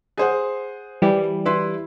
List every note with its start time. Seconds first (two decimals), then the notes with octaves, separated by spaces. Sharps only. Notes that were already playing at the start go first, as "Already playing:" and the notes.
0.17 G#4 C5 F#5
1.02 E3 G3
1.45 E4 B4 C6